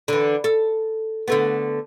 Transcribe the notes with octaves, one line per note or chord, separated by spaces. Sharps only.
D3 E3
A4
D3 A3 B3